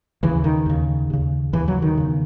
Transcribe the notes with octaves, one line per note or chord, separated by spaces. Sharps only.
D#2 C#3 E3
D#3
D#2 C#3
D#2 C#3
D#2 C#3 E3
F#3
D#3
E2 C#3